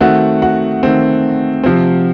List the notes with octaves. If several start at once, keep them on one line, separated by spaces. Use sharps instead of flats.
D#3 A3 C4 F#4 F#5
F#4 F#5
D#3 A3 C4
C3 F3 C4